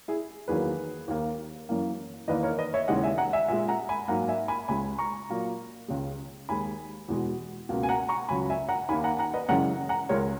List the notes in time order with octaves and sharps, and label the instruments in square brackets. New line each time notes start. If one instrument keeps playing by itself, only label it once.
[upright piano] E4 G#4
E2 D#3 F#3 A#3 G#4 B4
D#2 D#3 A#3
F#2 E3 A#3
E2 D#3 A#3 B4 D#5
A#4 C#5
B4 D#5
C#5 E5
D#2 C#3 E3 G#3 D#5 F#5
E5 G#5
F#5 A#5
E5 G#5
A#2 E5 G#5
G#3
F#5 A#5
G#5 B5
G#2 F#3 A#3 F#5 A#5
E5 G#5
G#5 B5
C#2 C#3 G#3 G#5 B5
A#5 C#6
A#2 F#3 A#3
C#2 C#3 G#3
D#2 D#3 G#3 G#5 B5
E2 B2 G#3
C#2 B2 A#3
G#5
F#5 A#5
A#5 C#6
C#2 C#3 F#3 G#5 B5
E5 G#5
F#5 A#5
D#2 D#3 A#3 G#5 B5
F#5 A#5
F#5 A#5
B4 D#5
F#2 C#3 E3 G#3 F#5 A#5
F#5 A#5
C#2 C#3 G#3 A#4 C#5